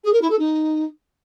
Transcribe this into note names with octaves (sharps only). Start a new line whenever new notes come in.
G#4
A#4
E4
A4
D#4